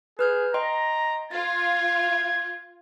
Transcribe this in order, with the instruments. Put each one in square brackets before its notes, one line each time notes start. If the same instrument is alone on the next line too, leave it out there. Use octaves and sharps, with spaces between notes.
[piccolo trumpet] G#4 [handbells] B4 F6 G6
[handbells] D#5 G5 C6 [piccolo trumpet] A#5
[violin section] F4 [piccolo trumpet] G#6 [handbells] A6